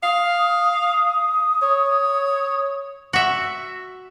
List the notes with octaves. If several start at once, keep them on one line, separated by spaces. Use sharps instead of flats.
F5 D#6
C#5
F#4 E5